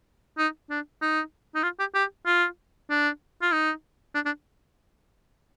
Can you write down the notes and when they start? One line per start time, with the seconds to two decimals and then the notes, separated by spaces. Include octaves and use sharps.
0.38 D#4
0.70 D4
1.02 D#4
1.55 D#4
1.63 F4
1.80 G4
1.95 G4
2.26 F4
2.90 D4
3.42 F4
3.52 D#4
4.15 D4
4.26 D4